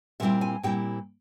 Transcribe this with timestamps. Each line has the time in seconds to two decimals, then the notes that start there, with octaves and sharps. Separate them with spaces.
0.20 A#2 G3 C4 E4 E5
0.41 G#5
0.63 A#2 G3 C4 E4 G5